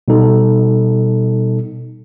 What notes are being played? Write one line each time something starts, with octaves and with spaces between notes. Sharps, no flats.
B2 G3 D#4 A4